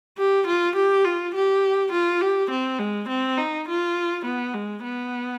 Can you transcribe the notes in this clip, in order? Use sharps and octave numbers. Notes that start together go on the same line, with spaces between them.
G4
F4
G4
F4
G4
F4
G4
C4
G#3
C4
D#4
F4
B3
G#3
B3